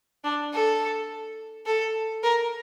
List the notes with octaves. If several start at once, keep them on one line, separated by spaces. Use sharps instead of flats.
D4
A4
A4
A#4